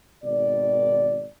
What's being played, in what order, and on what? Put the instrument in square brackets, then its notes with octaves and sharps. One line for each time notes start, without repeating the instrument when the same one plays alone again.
[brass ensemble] G#1 B2 D#3 D5